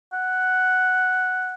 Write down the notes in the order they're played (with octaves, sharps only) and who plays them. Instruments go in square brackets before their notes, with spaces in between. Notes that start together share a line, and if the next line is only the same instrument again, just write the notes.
[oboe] F#5